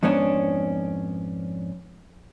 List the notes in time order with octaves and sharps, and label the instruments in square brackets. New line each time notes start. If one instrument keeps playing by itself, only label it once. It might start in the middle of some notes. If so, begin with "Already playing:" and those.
[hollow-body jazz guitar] F2 G#2 B3 C#4 D4